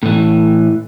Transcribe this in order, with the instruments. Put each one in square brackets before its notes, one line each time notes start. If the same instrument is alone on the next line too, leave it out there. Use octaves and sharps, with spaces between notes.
[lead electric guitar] A2 E3